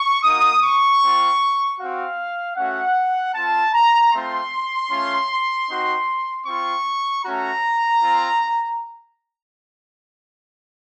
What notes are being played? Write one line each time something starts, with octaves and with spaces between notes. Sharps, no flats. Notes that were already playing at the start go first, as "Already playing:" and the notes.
Already playing: C#6
A#3 D#4 F#4 D#6
C#6
C4 F4
C4 F#4 F5
A3 C#4 F#4 F#5
C4 F4 A5
A#5
A3 C4 F4 C6
A3 C#4 F4
C4 D#4 F#4
C4 F4 C#6
A3 C#4 F#4 A#5
C4 F4